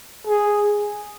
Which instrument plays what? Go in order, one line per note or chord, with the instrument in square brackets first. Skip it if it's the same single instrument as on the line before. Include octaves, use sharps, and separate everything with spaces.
[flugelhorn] G#4